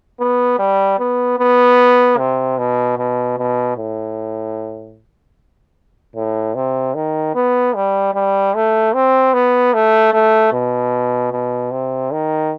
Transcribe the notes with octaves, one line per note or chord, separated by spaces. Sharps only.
B3
G3
B3
B3
C3
B2
B2
B2
A2
A2
C3
D#3
B3
G3
G3
A3
C4
B3
A3
A3
B2
B2
C3
D#3